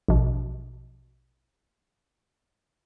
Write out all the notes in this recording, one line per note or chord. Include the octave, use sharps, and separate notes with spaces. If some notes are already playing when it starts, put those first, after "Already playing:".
A#1 B2